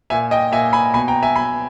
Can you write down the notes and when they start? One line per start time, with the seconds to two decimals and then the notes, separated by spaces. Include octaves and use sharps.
0.10 A#2 E5 G#5
0.31 D#5 G5
0.52 A#2 E5 G#5
0.73 G#5 B5
0.94 B2 G#5 B5
1.08 G5 A#5
1.23 E5 G#5
1.36 B2 G#5 B5